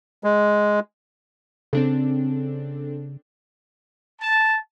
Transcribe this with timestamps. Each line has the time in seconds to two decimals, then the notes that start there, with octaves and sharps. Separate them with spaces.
0.24 G#3
1.73 C#3 C4 D4 A4
4.21 A5